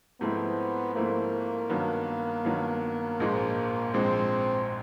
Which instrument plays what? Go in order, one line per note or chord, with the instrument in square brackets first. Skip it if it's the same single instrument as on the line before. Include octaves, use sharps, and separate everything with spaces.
[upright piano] G#2 F3 A3 C4 E4 [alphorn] B3
[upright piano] G#2 F3 A3 C4 E4 [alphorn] A#3
[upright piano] G2 D#3 F#3 B3
G2 D#3 F#3 B3
A#1 G#2 F3 G#3
[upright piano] A#1 G#2 F3 G#3 [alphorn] C4